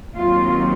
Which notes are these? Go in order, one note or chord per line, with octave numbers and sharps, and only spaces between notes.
D#2 D#3 F#3 C4 F4